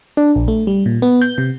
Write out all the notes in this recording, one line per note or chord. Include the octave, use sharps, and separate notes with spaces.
D4
A#1
A3
G3
A#2
B3
G6
C3